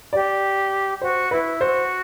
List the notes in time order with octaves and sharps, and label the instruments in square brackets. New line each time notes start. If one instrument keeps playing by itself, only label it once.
[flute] G4 [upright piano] D5
[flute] F#4 [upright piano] C5
[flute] E4 [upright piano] B4
[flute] F#4 [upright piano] C5